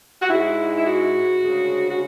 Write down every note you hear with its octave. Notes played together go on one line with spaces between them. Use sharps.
F#4
G#2 G#3 E4
E4
F#4
D2 C#3 G#3
F#4